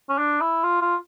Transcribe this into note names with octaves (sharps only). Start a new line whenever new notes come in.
C#4
D4
E4
F4
F4